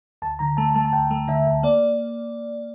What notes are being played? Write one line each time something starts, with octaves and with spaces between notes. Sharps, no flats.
D2 A5
D3 A#5
A3 A5
A3 A5
A5
D2 G5
A3
D3 E5
D2
A#3 D5